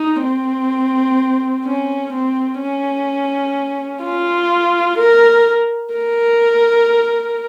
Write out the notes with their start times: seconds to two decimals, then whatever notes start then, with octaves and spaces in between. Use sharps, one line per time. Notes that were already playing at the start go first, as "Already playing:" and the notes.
Already playing: D#4
0.23 C4
1.65 C#4
2.13 C4
2.61 C#4
4.04 F4
4.99 A#4
5.94 A#4